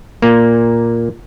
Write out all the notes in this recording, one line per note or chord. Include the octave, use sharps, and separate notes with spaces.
A#2 A#3